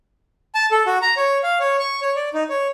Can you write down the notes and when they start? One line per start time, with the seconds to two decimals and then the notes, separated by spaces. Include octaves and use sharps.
0.55 A5
0.71 A4
0.86 F#4
1.02 A#5
1.17 C#5
1.43 F5
1.60 C#5
1.79 C#6
2.02 C#5
2.16 D5
2.34 D#4
2.49 C#5